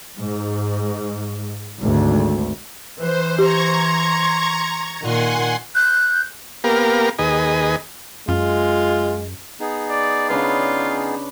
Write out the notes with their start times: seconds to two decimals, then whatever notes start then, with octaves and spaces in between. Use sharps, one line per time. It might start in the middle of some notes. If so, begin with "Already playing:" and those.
0.16 G#2
1.80 G#1 D2
2.98 E3 B4 C5
3.39 G4 A#5 C6 C#6 G#6
5.01 A#2 D#3 F#5 G#5 C6
5.75 F#6 G6
6.64 A#3 B3 G4 A#4 F5
7.19 D#2 G#4 B4 D#5
8.28 F#2 G#3 F4
9.60 B3 D#4 G#4
9.90 D5
10.30 C#3 D4 F4 B4